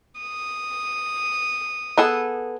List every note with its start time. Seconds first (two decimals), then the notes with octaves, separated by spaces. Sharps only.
0.21 D#6
1.98 B3 G#4 A4